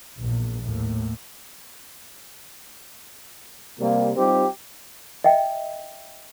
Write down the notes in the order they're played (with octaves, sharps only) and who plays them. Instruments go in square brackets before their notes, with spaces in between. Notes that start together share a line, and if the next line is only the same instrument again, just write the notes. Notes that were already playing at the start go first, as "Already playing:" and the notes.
[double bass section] A#1 E2 A#2
D#2 A2
[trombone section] C3 G3 A#3
G3 C4 D#4 F4 G4
[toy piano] D#5 E5 G5